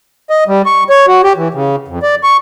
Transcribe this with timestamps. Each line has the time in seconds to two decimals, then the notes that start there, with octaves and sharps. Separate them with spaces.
0.30 D#5
0.48 G3
0.66 C#6
0.90 C#5
1.07 F#4
1.23 G4
1.37 E3
1.54 C#3
1.88 F2
2.02 D5
2.23 C#6